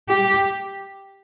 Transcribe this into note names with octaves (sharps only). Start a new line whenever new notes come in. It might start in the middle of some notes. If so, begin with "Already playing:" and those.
G4